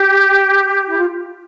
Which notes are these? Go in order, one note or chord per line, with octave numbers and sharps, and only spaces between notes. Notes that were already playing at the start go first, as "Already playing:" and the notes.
Already playing: G4
E4
F4